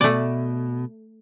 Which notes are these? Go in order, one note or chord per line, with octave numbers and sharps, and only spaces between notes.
B2 A3 D5